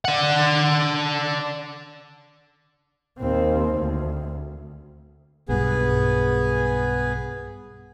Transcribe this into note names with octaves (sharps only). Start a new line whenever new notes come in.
D4 F#5
D#2 C4
D2
B1 G2 B3 G#4